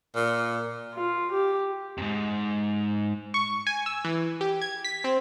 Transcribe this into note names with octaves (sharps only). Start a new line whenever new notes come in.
A#2
F4
G4
F2 G#2
C#6
G#5
E6
E3
G4
G#6
B6
C4